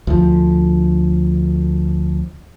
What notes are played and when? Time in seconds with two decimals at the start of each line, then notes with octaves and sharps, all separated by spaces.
0.07 D2 F3